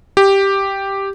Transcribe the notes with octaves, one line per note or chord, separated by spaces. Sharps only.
G4